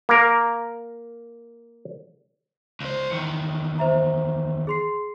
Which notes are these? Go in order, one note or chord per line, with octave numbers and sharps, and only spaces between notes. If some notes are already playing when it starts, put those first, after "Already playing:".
A#3 A#4
C#2 C5
E2 D#3 C#7
C5 E5 A#5
G#4 C6 C7